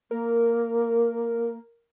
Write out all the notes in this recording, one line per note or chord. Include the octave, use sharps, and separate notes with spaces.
A#3 A#4